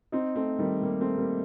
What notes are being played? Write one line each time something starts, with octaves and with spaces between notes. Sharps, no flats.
C4 D#4
A3 C4
D#3 G3
G3 A#3
A3 C4
G3 A#3